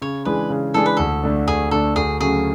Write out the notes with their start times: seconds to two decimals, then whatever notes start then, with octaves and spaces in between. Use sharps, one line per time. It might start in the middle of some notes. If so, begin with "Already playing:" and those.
0.02 C#3 C#5
0.25 E3 G#3 D4 G#4 B4
0.50 C#3
0.74 E3 G#3 D4 G#4 A4
0.86 B4
0.97 D2 A4
1.23 D3 A3 D4
1.48 D2 G#4
1.71 D3 A3 D4 A4
1.96 D2 G#4
2.21 C#3 F#3 A3 C#4 G#4